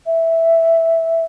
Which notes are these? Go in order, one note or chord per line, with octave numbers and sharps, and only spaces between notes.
E5